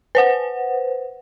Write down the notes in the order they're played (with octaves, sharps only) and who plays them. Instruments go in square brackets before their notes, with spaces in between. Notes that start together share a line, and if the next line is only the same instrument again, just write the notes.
[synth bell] B4 C5 F#5